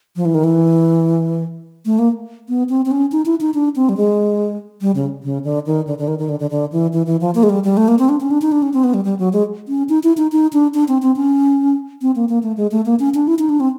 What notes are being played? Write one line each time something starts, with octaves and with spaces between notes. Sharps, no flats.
F3
E3
D#3
E3
A3
A#3
B3
C4
C4
C#4
D#4
E4
D#4
D4
C4
G3
G#3
G3
C#3
C#3
D3
D#3
D3
D3
D#3
D#3
D3
D3
D3
E3
E3
E3
F3
A#3
G#3
G3
G3
A3
A#3
C4
D4
C#4
D4
D#4
D4
C#4
C4
B3
G3
G3
F#3
G#3
C#4
D#4
E4
D#4
D#4
D4
D4
C4
C4
C#4
C4
A#3
A#3
A3
G#3
A3
A#3
C#4
D4
E4
D#4
D4
C4